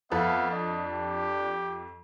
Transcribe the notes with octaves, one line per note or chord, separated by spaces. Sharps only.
F2 B3 A4 E5 F5
D4 D#5
G4